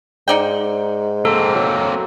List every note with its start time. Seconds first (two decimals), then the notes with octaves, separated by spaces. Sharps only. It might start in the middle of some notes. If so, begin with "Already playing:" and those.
0.28 G#2 D#4 D5 G5
1.25 A#3 C4 A4
1.55 F#3